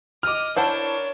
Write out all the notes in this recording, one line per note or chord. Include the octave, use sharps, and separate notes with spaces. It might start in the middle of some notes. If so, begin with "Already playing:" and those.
D#5 D6 F6
D4 E4 A#4 C5 C#5 F#5 A5